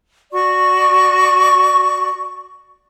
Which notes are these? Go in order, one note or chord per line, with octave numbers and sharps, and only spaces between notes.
F#4 D5 C#6